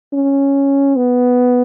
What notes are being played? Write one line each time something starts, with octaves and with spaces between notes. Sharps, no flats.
C#4
B3